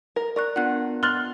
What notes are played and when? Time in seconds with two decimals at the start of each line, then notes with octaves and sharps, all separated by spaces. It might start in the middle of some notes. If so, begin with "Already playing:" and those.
0.16 A#4
0.36 A#4 D5 C#6 F#6
0.56 B3 D4 F4 F#5 F#6
1.03 C6 F6 F#6 A6 F#7 G7